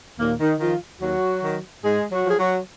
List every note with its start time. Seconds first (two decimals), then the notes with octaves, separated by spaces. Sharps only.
0.18 D#2 A#2 A#3
0.39 D#3 D#4
0.59 D#3 F3 F4
1.01 D#2 F#3 F#4
1.42 D#3
1.83 G#2 G#3 G#4
2.10 F#3 F#4
2.24 F3 G#4
2.38 F#3 F#4